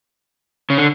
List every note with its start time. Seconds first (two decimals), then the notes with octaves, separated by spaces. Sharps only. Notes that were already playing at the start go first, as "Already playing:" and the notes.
0.70 C#3
0.78 D3